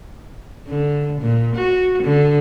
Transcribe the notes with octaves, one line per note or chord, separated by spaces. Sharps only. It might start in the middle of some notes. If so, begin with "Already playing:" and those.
D3
A#2
F#4
D3